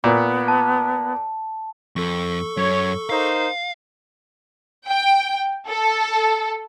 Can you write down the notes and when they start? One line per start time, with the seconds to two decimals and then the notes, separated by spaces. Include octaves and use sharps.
0.04 A#2 B3
0.48 A5
1.96 F2 A4 C#6
2.57 F#2 C#5
3.10 D#4 A#4 C5 F5
4.88 G5
5.67 A4